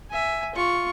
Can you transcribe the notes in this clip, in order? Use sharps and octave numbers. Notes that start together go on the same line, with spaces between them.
E5 G#5
F4 C#6